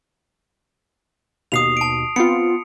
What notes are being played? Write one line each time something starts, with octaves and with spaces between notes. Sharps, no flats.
D#2 B2 D#6 C7 F7
A5 D7
B3 C4 F4 C#7